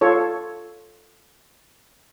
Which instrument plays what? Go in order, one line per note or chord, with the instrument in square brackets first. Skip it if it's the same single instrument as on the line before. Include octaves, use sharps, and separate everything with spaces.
[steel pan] F4 A4 C#5